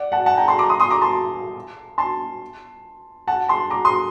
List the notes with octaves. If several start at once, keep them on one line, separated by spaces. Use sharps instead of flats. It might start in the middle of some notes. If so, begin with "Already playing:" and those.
Already playing: D5 F#5
F#5 A5
F#5 A5
G5 A#5
A5 C6
A#5 D6
C6 D#6
C6 D#6
A#5 D6
A5 C6
A5 C6
F#5 A5
A5 C6
A#5 D6
C6 D#6